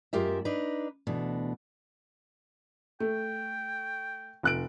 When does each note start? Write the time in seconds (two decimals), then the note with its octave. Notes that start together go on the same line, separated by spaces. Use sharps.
0.13 F#2 G#3 F4 G4 A#4 E5
0.45 D4 D#4 B4
1.07 D2 B2 E3 D4
3.00 A3 G5
4.43 F1 F#6 D7